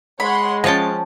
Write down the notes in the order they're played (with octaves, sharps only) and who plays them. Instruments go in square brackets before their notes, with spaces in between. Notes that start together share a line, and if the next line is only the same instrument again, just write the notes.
[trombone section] G#3 [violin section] C#5 F#5 C6 [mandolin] B5
[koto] F3 C#5 G5 [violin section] C#4 [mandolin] A5 A#5